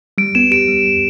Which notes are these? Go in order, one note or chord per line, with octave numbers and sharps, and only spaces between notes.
G3 D7
B3 E7
G4 D7
G3
G3